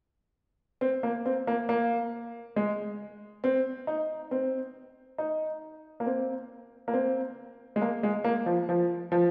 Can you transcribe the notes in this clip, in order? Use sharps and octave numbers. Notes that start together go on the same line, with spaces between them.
C4
A#3
C4
A#3
A#3
G#3
C4
D#4
C4
D#4
A#3
C4
A#3
C4
G#3
A#3
G#3
A#3
F3
F3
F3